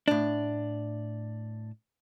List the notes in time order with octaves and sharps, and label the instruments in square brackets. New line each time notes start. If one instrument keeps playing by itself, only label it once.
[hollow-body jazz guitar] A2 D4